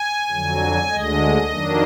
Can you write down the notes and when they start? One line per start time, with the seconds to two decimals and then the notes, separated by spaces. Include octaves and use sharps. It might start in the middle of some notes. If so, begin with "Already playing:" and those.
Already playing: G#5
0.30 F2 D3 F#3
0.90 D2 D3 G#3 D#5
1.50 F2 D#3 F#3 A#3 D4